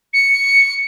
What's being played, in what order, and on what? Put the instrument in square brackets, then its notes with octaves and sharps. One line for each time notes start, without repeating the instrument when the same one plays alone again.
[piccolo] C#7